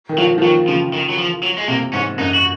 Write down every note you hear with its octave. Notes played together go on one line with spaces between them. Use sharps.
D#3
F3 F#3
F3
D#3 F#3
C#3 F3
D#3
F#3
F3
F#3
G#3
C3 A#3
G#2 C#4
F#2 D#4
F#4